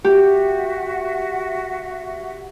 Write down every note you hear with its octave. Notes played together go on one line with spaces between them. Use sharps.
F#4 G4 E5 F#5